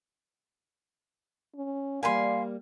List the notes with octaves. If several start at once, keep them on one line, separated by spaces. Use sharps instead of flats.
C#4
G3 A#3 A#4 D5 F5 G#5 B5 C6